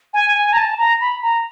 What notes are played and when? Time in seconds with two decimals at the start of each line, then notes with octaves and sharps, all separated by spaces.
0.14 G#5
0.35 G#5
0.53 A#5
0.57 A5
0.78 A#5
1.01 B5
1.22 A#5